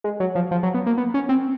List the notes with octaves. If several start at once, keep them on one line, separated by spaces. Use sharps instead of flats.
G#3
F#3
F3
F3
F#3
B3
A#3
B3
C#4
C4